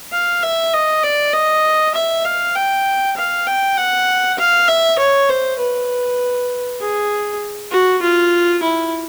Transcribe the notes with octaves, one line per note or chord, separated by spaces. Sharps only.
F5
E5
D#5
D5
D#5
E5
F5
G5
F5
G5
F#5
F5
E5
C#5
C5
B4
G#4
F#4
F4
E4